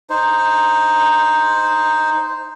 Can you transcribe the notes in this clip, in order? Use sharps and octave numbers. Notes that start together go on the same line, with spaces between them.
D#4 C5